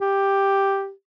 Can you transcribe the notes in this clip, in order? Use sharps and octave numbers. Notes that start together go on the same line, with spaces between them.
G4